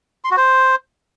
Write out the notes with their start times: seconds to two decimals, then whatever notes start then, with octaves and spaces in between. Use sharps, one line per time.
0.24 C6
0.31 F#4
0.37 C5